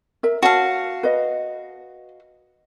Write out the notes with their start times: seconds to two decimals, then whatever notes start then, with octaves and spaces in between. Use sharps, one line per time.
0.23 A#4 E5
0.43 F#4 C#5 F5 A5
1.03 B4 D#5